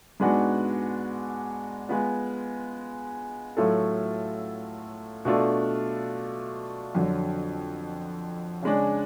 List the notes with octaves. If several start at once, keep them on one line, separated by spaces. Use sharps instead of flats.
G#2 G#3 B3 D4 F#4
G#3 B3 F4
A2 F#3 A3 F4 A4
B2 A3 D4 F4 A4
F2 D3 F#3
C#3 G#3 D4